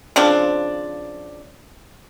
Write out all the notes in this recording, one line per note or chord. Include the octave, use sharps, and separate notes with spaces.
C#3 F3 C4 D4